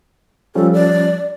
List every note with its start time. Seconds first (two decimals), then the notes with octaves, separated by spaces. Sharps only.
0.55 F3 G3 C#4 A4
0.73 D5